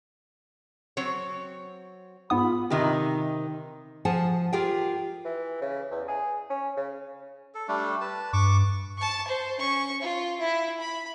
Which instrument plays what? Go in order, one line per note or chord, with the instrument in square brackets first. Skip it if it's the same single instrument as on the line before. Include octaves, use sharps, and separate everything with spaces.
[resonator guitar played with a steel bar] F#3 C4 C#5
[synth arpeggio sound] G#2 B3 D#6 [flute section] F4 G#4 B5
[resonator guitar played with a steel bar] C3 D#3 D#4 G4
[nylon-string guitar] F3 G#4 F#5 G#5 A5
F4 G4 G#4 A#4 F5 G5
[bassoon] E3
C#3
E2
G#4
C#4
C#3
[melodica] A4
G3 A3 D4
B4 A5
[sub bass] G2 [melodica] C#6 D6
[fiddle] A5 C#6
C5
C#4 C#6
F4
E4 E5
B5